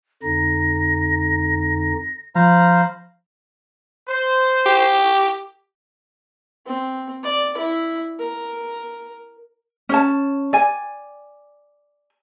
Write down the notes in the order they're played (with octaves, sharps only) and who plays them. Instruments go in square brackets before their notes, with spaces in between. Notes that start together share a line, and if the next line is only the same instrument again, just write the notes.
[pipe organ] F2 D3 D#4 [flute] A#6
[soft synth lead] F3 [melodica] C5 F5 A#5 [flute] B5
[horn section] C5
[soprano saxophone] G4
[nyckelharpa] C4
D5
E4
A#4
[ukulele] C#4 C#5 A5
D5 G#5